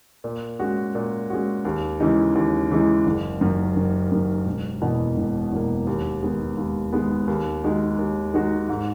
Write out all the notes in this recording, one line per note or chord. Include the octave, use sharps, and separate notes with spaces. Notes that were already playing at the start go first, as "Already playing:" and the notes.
A#2
G#3 C#4 F#4
A#2
G#3 C#4 F#4
D#2
C#3 E3 G#3 D#4
D#2
C#3 E3 G#3 D#4
F#1
F#2 D#3
F#1
F#2 D#3
E1
E2 B2 A#3
E1
E2 B2 A#3
D#2
D#3 G#3 B3
D#2
D#3 G#3 B3
D#2
D#3 G#3 D#4 F#4
D#2
D#3 G#3 D#4 F#4
G#2